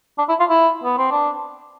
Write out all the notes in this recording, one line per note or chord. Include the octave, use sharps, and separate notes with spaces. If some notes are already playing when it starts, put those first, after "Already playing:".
D4
E4
F4
E4
B3
C4
D4